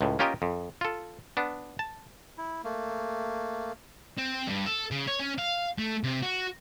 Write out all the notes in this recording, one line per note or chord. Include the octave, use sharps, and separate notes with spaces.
C#2 A2
A#3 C#4 F4 G4 A#4 D#5
F2
F4 A4
B3 D4
A5
E4
A3 A#3
C4
G2
A4
C#3
C#5
C#4
F5
A3
C3
F#4